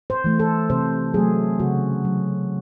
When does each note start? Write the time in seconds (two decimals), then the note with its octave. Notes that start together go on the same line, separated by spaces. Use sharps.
0.10 C5
0.24 E3 A3
0.39 A4
0.70 C3 C5
1.14 F#3 A3 G#4
1.60 C#3 F#4
2.05 F#3